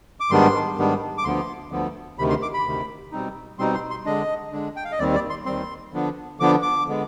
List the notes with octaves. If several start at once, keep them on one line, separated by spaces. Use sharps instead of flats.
D6
G#2 D#3 G3 B3 D4 C6
G#2 D#3 G3 B3 D4
D6
D2 D3 F3 B3 C6
D2 D3 F3 B3
D2 C3 D#3 B5
C6
D6
B5
D2 C3 D#3
B2 G3 C4 D#4
B2 G3 C4 D#4 C6
C6
C6
D3 G#3 D4 D#5
D3 G#3 D4
G5
F5
D#5
D#2 D#3 G3 C4 D5
D5
C6
D#2 D#3 G3 C4 C6
D3 F3 B3 D4
D3 F3 B3 D4 D6
D6
D3 G#3 B3